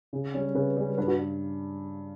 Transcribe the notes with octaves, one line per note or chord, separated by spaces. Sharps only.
C#3
G3 C#4
C#3 B4
G3 C#4
G2 B4
F#4